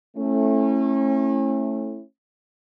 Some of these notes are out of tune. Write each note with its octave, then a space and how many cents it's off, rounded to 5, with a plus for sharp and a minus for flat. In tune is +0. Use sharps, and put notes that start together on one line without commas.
A3 +0 C#4 -35 E4 +0